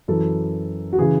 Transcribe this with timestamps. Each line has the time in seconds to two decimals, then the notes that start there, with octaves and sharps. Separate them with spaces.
0.08 F#2 E3 A4
0.93 F#4
0.98 C#3 E3 G#4